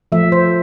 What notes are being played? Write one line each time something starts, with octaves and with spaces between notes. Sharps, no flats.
F3 A3 E5
C5